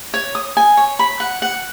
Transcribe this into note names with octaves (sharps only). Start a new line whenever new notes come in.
C#5
D#6
G#5
C#5
B5
F#5
F#5